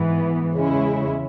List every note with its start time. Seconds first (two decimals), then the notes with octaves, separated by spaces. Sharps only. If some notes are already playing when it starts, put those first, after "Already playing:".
Already playing: G#2 E3 B3
0.53 E2 C#3 G#3 C#4 E4